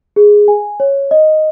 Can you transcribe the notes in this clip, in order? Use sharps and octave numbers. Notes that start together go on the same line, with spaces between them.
G#4
G#5
C#5
D#5